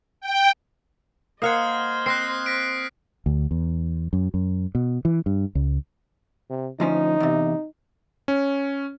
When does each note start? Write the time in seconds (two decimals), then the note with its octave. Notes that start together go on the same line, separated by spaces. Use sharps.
0.21 G5
1.42 A#3 C5 D#5 F5 F#5 D#6 F6 G#6
2.06 C4 F#6 A#6 C7
2.46 A#6 B6 D7
3.26 D2
3.51 E2
4.13 F#2
4.34 F#2
4.75 B2
5.05 E3
5.26 G2
5.55 C#2
6.50 C3
6.80 D2 F3 C#4 D#4
7.20 E2 C3
8.28 C#4